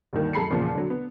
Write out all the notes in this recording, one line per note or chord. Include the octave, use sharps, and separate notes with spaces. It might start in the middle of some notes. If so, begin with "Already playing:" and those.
D2 G2 D#3 A#3
F#2 A4 A#5 B5 C7 C#7
E2 A#2 C#3 F3
D3 F#3
B3